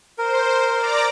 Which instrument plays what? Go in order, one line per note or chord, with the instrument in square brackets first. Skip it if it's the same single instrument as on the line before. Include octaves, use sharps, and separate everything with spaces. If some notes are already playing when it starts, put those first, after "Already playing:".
[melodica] A#4 [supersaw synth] C5
[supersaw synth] D5 A#5 D6